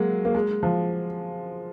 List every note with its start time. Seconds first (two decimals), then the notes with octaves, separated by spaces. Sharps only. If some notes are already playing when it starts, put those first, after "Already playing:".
Already playing: F#3 G#3 A#3
0.25 A#3
0.35 G#3
0.63 F3